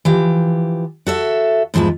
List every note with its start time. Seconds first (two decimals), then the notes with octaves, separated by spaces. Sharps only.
0.05 E3 F3 G4
1.06 F#4 A4 E5
1.74 E2 G#2 F3 G#3 E4